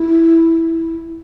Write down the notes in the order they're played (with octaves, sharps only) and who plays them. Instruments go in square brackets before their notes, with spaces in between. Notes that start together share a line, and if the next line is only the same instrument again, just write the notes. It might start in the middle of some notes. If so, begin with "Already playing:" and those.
Already playing: [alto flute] E4